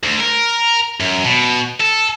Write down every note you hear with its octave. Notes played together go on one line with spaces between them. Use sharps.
D2
A#4
F#2
B2
A4